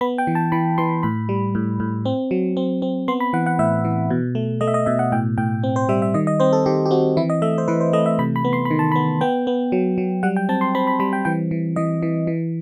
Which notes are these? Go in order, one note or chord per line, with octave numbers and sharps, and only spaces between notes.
B3 B5
G5
E3
A5
E3 B5
E3 C6
A2 B5
G3
A2
A2
C4
F#3
C4
C4
B3 C6
B5
E3 F#5
F#5
A2 E5
E3
B2
A3
A3 D#5
E5
D#5
B2 E5
F#5
A2 G5
A2 G5
C4
C5
G3 E5
E5
D#3 D#5
D#5
C4 C5
A4
D#3 G4
G4
C4 F#4
E3 E4
D#5
A3 E5
C5
E3 B4
C5
A3 D#5
E5
C3 B5
B5
B3
C6
B5
D#3
A5
B5
B3
B3 G5
B3
F#3
F#3
G3 F#5
G5
C4 A5
C6
C4 B5
B5
G3 B5
G5
E3 G5
E3
E3 D#5
E3
E3